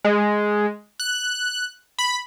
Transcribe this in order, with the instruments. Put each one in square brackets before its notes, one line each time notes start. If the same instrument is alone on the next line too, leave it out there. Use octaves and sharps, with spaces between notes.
[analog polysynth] G#3
F#6
B5